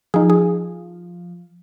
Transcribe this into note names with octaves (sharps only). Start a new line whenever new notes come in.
F3 D#4 G#4
G#4